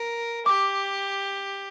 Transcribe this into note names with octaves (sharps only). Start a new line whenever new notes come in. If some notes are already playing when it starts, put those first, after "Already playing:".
Already playing: A#4
G4 D6